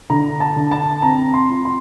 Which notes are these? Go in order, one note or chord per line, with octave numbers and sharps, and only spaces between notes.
D3 A#5
A5
D3
A5
C4 A#5
C6
F3
C6